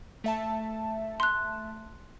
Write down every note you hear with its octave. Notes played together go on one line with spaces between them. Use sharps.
A3 E5 A5
C6 F#6